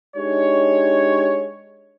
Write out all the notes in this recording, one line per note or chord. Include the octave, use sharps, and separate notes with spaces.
G#3 D4 D#4 G4 C#5